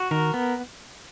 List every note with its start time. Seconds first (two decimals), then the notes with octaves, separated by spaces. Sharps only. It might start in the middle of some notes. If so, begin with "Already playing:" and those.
Already playing: F#4
0.11 D#3 A#4
0.34 B3